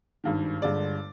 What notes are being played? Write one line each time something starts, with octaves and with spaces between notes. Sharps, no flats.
G#1 G2 D#3
G1 G2 D3 G#3 D5